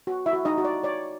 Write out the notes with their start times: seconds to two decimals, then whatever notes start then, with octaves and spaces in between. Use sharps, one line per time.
0.07 F#4
0.26 E4 E5
0.33 F#4
0.45 D#4 D#5
0.58 F#4
0.65 D5
0.83 C#5 D5